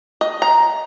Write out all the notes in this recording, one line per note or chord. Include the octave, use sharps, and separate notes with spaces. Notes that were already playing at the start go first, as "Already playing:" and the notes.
D#5
A#5